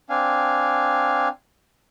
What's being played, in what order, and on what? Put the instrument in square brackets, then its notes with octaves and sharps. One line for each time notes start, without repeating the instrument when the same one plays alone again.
[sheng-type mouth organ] C4 D4 F5 G#5